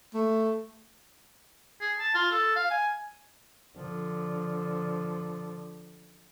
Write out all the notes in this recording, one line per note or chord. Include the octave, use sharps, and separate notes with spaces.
A3
G#4
A5
F4
A4
F5
G#5
D3 F3